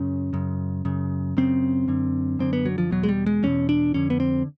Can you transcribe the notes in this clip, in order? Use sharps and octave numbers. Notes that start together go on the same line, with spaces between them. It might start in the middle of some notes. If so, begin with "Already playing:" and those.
Already playing: F#2 C#3 C#4
F#2 C#3
F#2 C#3
F#2 C#3 C4
F#2 D3
F#2 D3 C4
B3
F#3
F3
E2 B2 F#3
G#3
G3
G#3
E2 B2 C#4
D4
F2 D3 C#4
B3
C4